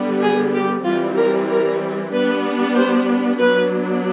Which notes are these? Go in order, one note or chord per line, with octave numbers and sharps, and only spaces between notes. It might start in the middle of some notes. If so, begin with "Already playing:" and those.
Already playing: D3 G3 B3
G#4
G4
E3 G3 C4 F4
A#4
A#4
G3 B3 D4 B4
C5
F#3 B3 D4 B4